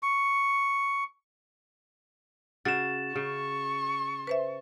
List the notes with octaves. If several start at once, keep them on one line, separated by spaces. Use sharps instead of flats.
C#6
C#3 F#4 A6 E7
C#3 C#6
B4 C5 E5